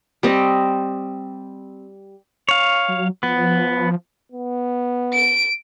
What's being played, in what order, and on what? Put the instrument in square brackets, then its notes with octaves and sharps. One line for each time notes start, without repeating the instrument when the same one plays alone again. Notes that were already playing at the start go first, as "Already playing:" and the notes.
[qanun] G3 C4 D#5
[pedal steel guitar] C#5 F5
[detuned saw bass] F#3
[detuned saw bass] F3 [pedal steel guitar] B3
[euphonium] B3
[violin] D7